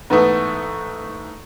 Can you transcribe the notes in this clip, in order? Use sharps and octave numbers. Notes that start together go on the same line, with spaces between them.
G#2 E3 A3 B3